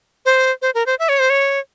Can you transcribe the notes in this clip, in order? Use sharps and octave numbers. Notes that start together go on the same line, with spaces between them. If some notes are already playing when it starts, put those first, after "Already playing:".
C5
C5
A#4
C5
E5
C#5
C5
C#5